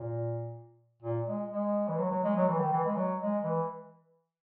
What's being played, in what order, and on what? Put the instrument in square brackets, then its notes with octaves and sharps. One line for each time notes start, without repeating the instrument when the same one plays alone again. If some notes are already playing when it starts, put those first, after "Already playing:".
Already playing: [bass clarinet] A#2
A#2
G#3
G#3
E3
F#3
F#3
G#3
F#3
E3
D#3
E3
G#3
F#3
G#3
E3